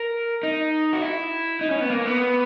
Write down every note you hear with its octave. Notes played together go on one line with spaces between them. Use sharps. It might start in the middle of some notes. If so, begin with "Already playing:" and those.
Already playing: A#4
D#4
F#4
E4
D#4
C#4
B3
A#3
B3